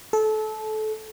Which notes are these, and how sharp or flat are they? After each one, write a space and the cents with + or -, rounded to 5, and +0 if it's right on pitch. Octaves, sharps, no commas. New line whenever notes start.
A4 -25